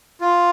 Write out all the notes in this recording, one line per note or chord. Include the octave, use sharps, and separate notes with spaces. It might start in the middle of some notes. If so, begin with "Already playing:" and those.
F4